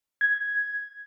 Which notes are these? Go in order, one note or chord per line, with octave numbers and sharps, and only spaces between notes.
G#6